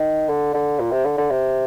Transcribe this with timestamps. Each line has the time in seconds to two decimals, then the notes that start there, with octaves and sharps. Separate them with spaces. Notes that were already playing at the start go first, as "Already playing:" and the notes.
Already playing: D#3
0.29 D3
0.54 D3
0.79 A#2
0.92 C3
1.05 D3
1.18 D3
1.30 C3